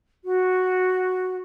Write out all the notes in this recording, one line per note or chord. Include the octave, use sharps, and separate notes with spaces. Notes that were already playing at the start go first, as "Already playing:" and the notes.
F#4